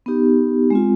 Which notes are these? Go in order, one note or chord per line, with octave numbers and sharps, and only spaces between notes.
B3 D#4 G4
G#3 C4 F4